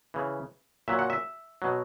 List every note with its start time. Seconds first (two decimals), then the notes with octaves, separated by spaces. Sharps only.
0.14 C#3 E3
0.88 A#2 F#3 E5
0.99 F#5
1.10 E5
1.62 B2 F#3